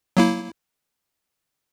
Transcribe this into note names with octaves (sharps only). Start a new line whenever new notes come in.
F#3 A#3 E4